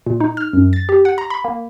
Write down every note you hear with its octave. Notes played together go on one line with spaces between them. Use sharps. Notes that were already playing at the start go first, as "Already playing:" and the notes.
A#2
D#4
F6
F#2
A6
G4
F#5
A#5
B5
A#3